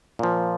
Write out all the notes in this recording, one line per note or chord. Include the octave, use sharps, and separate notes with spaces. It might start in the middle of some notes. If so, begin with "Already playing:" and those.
A#2 F3